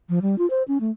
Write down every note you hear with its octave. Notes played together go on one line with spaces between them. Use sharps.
F3
G3
F4
C5
C#4
A3